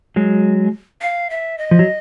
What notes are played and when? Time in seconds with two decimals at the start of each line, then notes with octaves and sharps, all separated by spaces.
0.16 F#3 G#3
1.02 F5
1.30 E5
1.58 D#5
1.71 F3
1.79 F#3